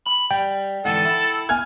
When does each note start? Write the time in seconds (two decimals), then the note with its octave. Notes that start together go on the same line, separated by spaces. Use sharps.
0.06 B5
0.31 G3 G5
0.85 G#2 D3 E3 A4 F#5
1.05 E4
1.49 G#5 F6 G#6